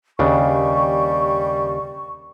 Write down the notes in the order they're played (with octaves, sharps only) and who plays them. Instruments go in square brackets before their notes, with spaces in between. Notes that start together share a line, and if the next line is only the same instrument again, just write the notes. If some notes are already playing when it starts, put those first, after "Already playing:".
[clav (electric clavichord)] D#2 C#3 D4 [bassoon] G3 [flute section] C#6